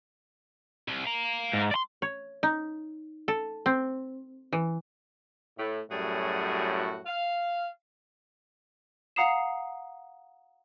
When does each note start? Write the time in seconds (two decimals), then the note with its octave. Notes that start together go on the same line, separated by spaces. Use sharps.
0.88 C2
1.06 F5 A#5
1.53 G#2
1.71 D5 C6
2.02 C#5
2.43 D#4
3.28 A4
3.66 C4
4.53 E3
5.58 A2
5.91 F#2 A2 G3 F#4 G#4
7.07 F5
9.16 F5 F#5 A#5 D#6 C7 E7